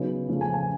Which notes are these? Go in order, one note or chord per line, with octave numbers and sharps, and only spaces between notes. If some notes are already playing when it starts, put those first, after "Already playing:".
Already playing: C#3 F#3 B3 D#4
C#3 F3 A3 C#4
G#5
G#5